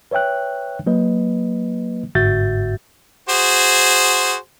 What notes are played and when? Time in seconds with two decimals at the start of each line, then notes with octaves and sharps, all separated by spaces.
0.11 B4 C#5 E5 G5 F#6
0.86 F#3 A#3 B4 D#5
2.15 G1 G#2 F#4 E5 G6 A6
3.29 F#4 G#4 C5